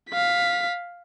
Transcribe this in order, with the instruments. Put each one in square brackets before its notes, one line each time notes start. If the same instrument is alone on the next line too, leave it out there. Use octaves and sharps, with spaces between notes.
[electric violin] F5 B6